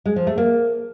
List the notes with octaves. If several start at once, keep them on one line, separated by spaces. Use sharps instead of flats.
G#3
F3
A3
A#3